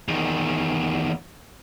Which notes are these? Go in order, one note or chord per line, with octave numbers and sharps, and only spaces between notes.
E2 D#3